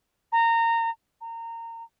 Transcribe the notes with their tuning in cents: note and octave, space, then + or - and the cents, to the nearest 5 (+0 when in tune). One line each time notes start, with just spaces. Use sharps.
A#5 -20
A#5 -25